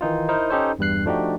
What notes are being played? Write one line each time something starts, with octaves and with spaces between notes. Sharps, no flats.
D#3 E3 D#4 F4
D#4 E4 A#4 C5
C#4 D#4 G4 A4 C5 C#5
E2 G2 G3 F#6 C7
F3 A3 D4 D#4 F#4 G4